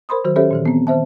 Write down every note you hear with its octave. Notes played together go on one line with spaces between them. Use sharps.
A#4 C5 B5 C6 D#6
D#3 F#3 F#4 C5
C#4 G4 A4 C5 C#5 E5
A#2 D#3 E3
B3 C4
D#3 C5 E5 A5